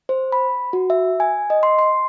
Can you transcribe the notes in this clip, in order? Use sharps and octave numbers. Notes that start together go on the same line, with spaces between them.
C5
B5
F#4
E5
G#5
D#5
C6
C6